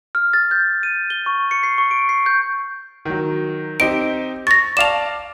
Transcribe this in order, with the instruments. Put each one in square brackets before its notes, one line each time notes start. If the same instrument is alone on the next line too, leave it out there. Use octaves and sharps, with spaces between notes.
[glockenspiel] F6
A6
G6
D#7
G7
C#6
C#7
C7
C#6
D7
C7
G6
[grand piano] D#3 F#3
[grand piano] C4 D#4 G4 [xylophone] D7
[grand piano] C#6 [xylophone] A6 A#6
[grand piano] D5 F5 A5 [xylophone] E7 F7